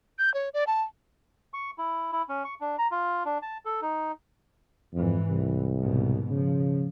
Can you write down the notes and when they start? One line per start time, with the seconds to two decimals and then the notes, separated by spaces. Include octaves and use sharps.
0.19 G6
0.34 C#5
0.54 D5
0.67 A5
1.54 C#6
1.78 E4
2.12 E4
2.29 C#4
2.45 C#6
2.61 D4
2.78 A#5
2.91 F4
3.25 D4
3.42 A5
3.65 A4
3.82 D#4
4.94 F2 G#2 E3
5.29 C2
5.81 G#2 B2 D#3
6.30 C#3 F3